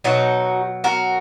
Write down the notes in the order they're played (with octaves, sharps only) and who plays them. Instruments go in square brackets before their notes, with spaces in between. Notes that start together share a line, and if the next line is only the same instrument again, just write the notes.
[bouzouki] B2 F#3 D#4 F#4
F#4 A#4